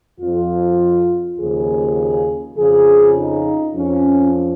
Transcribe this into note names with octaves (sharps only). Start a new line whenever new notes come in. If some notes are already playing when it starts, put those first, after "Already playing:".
F2 F3 F4
D#2 C#3 F3 G#4
F2 C#3 F3 G#4
D#4
F2 F3 C#4